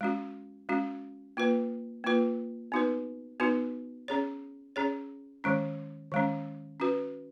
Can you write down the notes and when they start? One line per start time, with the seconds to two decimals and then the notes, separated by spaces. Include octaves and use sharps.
0.01 G#3 C#4 F#4
0.69 G#3 C#4 F#4
1.37 A#3 F4 B4
2.04 A#3 F4 B4
2.72 B3 D#4 F#4 B4
3.40 B3 D#4 F#4 B4
4.08 C#4 G#4 C#5
4.76 C#4 G#4 C#5
5.44 D#3 G#3 C#4
6.12 D#3 G#3 C#4
6.80 C#4 F#4 B4